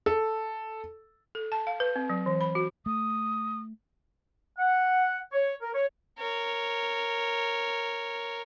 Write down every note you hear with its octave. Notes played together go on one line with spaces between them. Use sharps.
A4
A4
A5
F5
B4
C4
F#3
E3
B5
F#4
A3 D#6
F#5
C#5
A#4
C#5
A#4 C#5